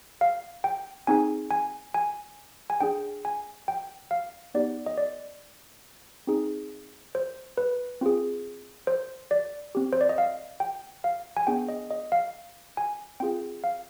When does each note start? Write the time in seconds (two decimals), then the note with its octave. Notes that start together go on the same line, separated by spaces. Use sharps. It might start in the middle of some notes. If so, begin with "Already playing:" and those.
0.21 F5
0.64 G5
1.07 C4 D#4 G#4 G#5
1.51 G#5
1.94 G#5
2.70 G#5
2.80 D4 G#4 G5
3.25 G#5
3.68 G5
4.11 F5
4.54 B3 D#4 G4 D5
4.86 D#5
4.98 D5
6.27 C4 D#4 G#4
7.15 C5
7.58 B4
8.01 C4 F4 G#4
8.87 C5
9.31 D5
9.75 C4 G4
9.93 C5
10.01 D5
10.09 D#5
10.18 F5
10.60 G5
11.04 F5
11.37 G#5
11.47 B3 D4 G#4 G5
11.69 D#5
11.91 D#5
12.12 F5
12.77 G#5
13.20 C4 F4 G#4 G5
13.64 F5